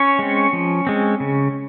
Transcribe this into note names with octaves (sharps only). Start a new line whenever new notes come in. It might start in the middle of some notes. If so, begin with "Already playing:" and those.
Already playing: C#4 C#5
G#3 C4
F3
G#3 C4
C#3